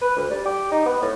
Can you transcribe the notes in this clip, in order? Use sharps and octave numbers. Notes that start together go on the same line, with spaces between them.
B4
D2
G3
G4
D#4
B3
A2